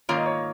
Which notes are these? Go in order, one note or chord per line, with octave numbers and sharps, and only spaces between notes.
G#2 D#3 A#3 F4 C#5
D#5
C#5